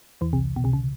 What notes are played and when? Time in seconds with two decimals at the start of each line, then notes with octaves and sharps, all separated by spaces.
0.21 E2 E3
0.33 C2 C3
0.56 B2
0.64 C2 C3
0.73 C#3